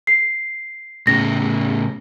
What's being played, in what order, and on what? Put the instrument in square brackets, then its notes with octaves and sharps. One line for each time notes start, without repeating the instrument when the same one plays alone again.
[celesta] C7
[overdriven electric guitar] A2 C#3 [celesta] A#6